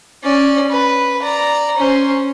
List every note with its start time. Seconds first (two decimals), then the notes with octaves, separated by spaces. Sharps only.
0.24 C#4 D5
0.70 B4
1.22 D5 A#5
1.76 C#4 C5